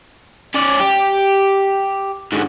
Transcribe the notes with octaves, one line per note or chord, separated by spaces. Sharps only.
C#4 D5
G4
G#2 D3